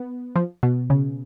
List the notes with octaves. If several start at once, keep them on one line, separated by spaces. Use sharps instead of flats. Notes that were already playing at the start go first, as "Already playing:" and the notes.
Already playing: B3
F3
B2
C#3